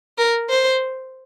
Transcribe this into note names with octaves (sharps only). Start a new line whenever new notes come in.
A#4
C5